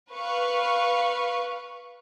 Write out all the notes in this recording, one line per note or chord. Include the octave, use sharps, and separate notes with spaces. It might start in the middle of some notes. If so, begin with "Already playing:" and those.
B4 F5 C#6